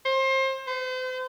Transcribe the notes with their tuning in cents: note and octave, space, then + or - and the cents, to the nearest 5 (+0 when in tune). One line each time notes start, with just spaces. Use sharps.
C5 +30
C5 -40